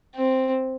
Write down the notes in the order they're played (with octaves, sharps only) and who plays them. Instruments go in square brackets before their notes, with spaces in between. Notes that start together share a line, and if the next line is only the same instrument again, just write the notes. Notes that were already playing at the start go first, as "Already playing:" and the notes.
[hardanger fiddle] C4